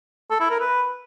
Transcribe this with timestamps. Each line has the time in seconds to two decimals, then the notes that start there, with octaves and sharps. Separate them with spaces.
0.30 A4
0.40 E4
0.50 A#4
0.60 B4